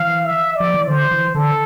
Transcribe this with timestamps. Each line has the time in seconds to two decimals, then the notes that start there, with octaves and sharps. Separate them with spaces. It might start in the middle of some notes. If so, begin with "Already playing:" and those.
Already playing: E3 F5
0.25 E5
0.56 F3 D5
0.74 E3
0.87 D3 C5
1.11 E3
1.35 D3 A4